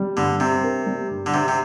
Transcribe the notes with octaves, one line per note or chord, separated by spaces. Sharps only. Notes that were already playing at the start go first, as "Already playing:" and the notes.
Already playing: G3
G2 D3
C3 C4
A#4
G3
G2
D3
C3 D4
C3